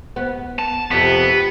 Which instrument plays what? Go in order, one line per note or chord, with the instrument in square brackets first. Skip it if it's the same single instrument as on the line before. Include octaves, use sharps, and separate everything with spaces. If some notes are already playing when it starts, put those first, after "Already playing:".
[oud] B3
[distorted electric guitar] A5
[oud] F2 C3 [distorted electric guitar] B3